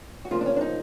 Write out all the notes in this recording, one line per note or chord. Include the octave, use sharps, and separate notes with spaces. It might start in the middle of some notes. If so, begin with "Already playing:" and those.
F#4
D2 C#3 F3 A#3 F4
D4
C#4
D4
D#4